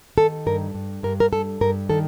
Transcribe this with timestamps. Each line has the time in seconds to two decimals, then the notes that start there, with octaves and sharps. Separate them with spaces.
0.18 D#3 A4
0.46 G2 A#4
0.75 G2
1.03 G2 A#4
1.20 A#4
1.32 G2 A4
1.61 G2 A#4
1.90 D#3 A4